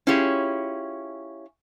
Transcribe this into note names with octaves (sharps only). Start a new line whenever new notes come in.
C#4 E4 F4 G4 G#4 C#5